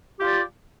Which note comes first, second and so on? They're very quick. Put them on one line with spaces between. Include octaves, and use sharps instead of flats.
G4 F4 D5